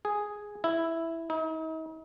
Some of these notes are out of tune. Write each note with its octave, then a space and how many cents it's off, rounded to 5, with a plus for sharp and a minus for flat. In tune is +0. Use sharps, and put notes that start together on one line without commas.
G#4 +0
E4 +0
D#4 +40